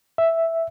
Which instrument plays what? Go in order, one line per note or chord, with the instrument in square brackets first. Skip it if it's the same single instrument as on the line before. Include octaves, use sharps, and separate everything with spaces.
[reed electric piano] E5